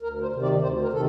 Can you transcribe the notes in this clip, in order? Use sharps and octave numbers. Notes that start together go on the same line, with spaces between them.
D2 A#4
C5
C3 D#3
D5
D2 C5
A#4
C3 D#3 A4